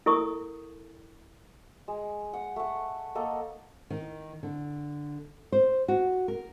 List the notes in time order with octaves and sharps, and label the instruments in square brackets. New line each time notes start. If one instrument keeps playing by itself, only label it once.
[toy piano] E4 A4 A#4 C#6 D#6
[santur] G#3
F#5
A3 F#5
A#3 A4 D#5
[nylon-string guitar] D#3
D3
C5
F#4
A#4